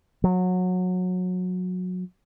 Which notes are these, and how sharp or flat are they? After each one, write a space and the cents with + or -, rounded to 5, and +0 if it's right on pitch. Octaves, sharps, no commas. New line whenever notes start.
F#3 -20